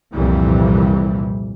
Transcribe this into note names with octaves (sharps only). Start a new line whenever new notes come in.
C2 F2 A#2 E3 G3